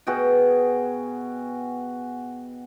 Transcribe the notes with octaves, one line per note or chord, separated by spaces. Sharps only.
B2 F#4 G#4 G5